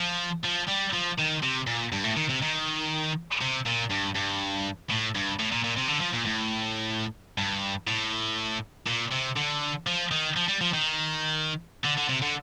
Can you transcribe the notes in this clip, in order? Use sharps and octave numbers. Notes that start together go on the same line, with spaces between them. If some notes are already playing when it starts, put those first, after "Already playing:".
Already playing: F3
F3
G3
F3
D#3
C3
A#2
G2
A2
D#3
C3
D#3
C3
A#2
G2
G2
A2
G2
A2
A#2
A#2
C3
D3
F3
A#2
A2
G2
A2
A#2
C3
D3
F3
D#3
F3
G3
F3
D#3
D3
D3
C3
D3